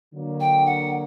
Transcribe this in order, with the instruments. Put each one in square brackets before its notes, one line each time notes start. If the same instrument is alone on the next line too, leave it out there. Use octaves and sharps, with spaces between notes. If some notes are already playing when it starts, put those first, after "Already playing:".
[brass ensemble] D3 F#3 A#3
[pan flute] G5
F#5